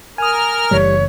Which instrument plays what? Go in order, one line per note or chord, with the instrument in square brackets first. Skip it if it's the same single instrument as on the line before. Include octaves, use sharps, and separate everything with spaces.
[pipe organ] A#4 F6 [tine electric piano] G#5 D#6
[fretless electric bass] F#1 E3 A3 [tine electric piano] G3 [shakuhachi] C#5